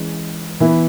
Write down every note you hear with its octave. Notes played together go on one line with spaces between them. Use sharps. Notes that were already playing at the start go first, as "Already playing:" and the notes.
Already playing: E3 G#3 C#4
E3 B3 E4 B4